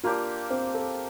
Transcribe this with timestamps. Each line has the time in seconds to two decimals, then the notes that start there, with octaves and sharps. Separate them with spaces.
0.04 A#3 D4 F4 G4 D5
0.50 C4
0.74 A4